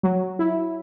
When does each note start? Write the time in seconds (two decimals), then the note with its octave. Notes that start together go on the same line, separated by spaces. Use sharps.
0.03 F#3
0.39 E4